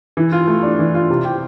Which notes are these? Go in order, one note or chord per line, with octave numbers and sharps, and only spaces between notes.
E3
F4
A3
D4
E3
F4
C3
G4